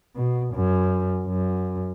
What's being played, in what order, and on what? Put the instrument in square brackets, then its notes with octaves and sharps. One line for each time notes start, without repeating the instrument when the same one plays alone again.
[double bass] B2
F#2
F#2